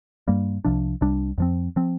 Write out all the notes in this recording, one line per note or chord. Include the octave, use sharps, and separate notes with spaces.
G2 G3 A#3
C2 C3 F3 D4
C2 C3 G3 D4
F2 F3 C4
F3 C4